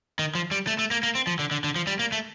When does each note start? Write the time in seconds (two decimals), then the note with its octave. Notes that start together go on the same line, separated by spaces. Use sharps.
0.19 D#3
0.35 F3
0.51 G3
0.67 A3
0.79 A3
0.91 A#3
1.03 A#3
1.15 C4
1.27 F3
1.39 D3
1.51 D3
1.64 D3
1.76 F3
1.87 G3
1.99 A#3
2.12 A3